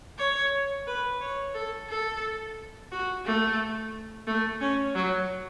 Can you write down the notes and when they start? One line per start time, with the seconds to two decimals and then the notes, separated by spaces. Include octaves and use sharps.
0.18 C#5
0.87 B4
1.21 C#5
1.54 A4
1.89 A4
2.91 F#4
3.25 A3
4.27 A3
4.61 C#4
4.95 F#3